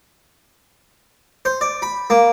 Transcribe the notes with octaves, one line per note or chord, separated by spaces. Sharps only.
C5
D5
B5
A#3